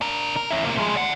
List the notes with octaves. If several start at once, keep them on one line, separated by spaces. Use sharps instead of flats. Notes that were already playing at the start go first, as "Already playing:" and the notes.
D4 A#4
A#4
C#4 E4
C3 A#3
F3 G#3
D5 F#5